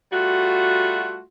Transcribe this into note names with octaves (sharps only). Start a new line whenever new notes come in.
G3 A3 F4 F#4